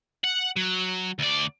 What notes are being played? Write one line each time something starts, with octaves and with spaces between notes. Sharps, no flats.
F#5
F#3
D2 D5